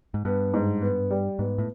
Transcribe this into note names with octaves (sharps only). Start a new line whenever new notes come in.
G#2
G2 B3
G#2
B3
G3
G#2 B3
A2